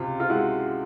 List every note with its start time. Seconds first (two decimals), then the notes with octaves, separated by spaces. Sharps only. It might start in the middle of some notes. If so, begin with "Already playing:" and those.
Already playing: C#2 C3 F4
0.20 F4
0.29 G#3 E4 F#4